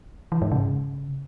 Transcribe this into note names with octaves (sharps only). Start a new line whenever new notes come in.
E3
G#2
C#3